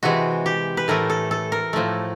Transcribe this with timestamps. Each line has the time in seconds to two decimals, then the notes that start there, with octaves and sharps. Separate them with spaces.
0.03 C3 E3 G#3 F#4
0.46 G4
0.77 B4
0.88 A2 E3 A3 A#4
1.10 A4
1.31 A4
1.52 A#4
1.73 A2 F3 A3